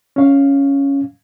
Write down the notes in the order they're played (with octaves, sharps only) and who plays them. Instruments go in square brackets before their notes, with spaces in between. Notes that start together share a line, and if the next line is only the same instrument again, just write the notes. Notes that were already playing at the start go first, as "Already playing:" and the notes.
[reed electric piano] C#4 F5